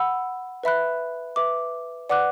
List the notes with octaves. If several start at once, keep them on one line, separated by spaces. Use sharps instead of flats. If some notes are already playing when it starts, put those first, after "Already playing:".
Already playing: F#5 B5 E6
B4 E5 B5 F#6
B4 E5 D6
B4 D5 F#5 D6 F#6